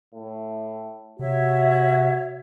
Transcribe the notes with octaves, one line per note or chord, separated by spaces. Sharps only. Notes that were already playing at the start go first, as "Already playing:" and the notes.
A2
C3 F#4 C#5 E5